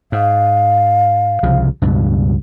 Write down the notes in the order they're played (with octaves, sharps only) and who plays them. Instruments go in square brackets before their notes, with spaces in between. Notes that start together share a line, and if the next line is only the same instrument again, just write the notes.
[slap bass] G#2 [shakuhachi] F5
[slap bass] C2 C#3 F3
C#2 G2 B2